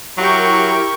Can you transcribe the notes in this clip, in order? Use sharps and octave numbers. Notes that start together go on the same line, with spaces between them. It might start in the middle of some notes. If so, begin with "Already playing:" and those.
F#3 E4 G4 A#4 G5 C#6